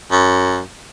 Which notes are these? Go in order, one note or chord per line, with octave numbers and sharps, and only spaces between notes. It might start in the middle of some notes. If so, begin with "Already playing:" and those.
F#2